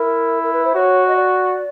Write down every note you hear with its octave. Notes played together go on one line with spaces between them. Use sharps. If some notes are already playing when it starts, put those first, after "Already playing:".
Already playing: E4 A#4
A#4
B4
C5
F#4 C#5
D#5
D5